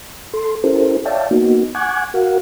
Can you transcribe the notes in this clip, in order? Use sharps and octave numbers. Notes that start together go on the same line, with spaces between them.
A4 C6
C#4 E4 G4 A4 A#4 C5
C#5 D5 E5 F5 G5 A5
A#3 B3 D#4 F#4
F#5 G#5 C#6 D6 F#6 G#6
F#4 A#4 F5 F#5